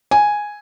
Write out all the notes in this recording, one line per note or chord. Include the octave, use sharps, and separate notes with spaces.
G#5